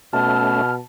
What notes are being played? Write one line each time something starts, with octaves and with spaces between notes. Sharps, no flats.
B2 A3 C#4 E5 A5 F6